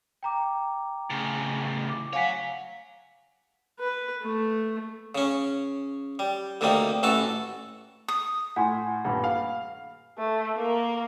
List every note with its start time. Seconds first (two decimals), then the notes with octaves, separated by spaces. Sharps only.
0.23 G5 A#5 D6
1.10 A2 C#3
1.90 D6
2.13 C#5 F5 F#5 G#5 B6
3.79 B4
4.22 A3
5.15 C#3 C#4
6.19 G3
6.61 D2 C3 D#3 G3 A#3
7.03 A1 E3 F#4 A4 A5
8.08 D#6
8.56 A2 F#5 G#5 C6
9.05 D#1 G2 F#5 B5
9.24 F5
10.18 A3
10.56 A#3 A#4